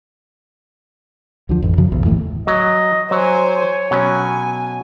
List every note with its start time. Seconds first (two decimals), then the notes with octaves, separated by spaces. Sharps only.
1.49 D2 D3 F3
1.62 A1 F2
1.78 F#2 C#3 F3 F#3
1.92 F#1 B1 E2
2.05 G1 D#2 A2 E3
2.47 F#3 D#5
3.11 F#3 C5 C#5 G#5
3.91 B2 F#3 C#4 G#5